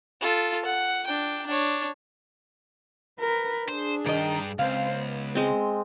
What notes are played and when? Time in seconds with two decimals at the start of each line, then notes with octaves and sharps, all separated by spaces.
0.21 F4 A4
0.65 F#5
1.07 D4 G5
1.47 D4 C#5
3.20 A#4 B4
3.69 D4 G#4 C5
4.06 G2 D#3 D#5 G5
4.59 C#2 C4 C5 F5
4.95 B3
5.35 G#3 C4